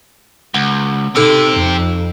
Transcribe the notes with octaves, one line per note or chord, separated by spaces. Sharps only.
C#2 F#5
C3 C4 D#4 G4 A4 E6
F2